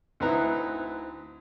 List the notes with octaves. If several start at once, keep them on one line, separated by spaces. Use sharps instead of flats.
D2 C4 D#4 E4 B4 A#5